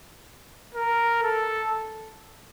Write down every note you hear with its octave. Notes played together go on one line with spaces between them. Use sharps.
A#4
A4